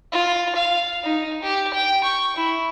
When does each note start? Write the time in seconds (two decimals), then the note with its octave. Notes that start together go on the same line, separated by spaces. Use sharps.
0.12 F4
0.56 F5
1.03 D#4
1.43 G4
1.74 G5
2.04 C#6
2.36 E4